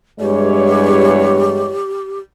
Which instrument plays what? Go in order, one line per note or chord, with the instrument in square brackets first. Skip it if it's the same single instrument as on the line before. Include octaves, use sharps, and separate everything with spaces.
[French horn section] E2 C#5 [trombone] G2 [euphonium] G#3 [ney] G4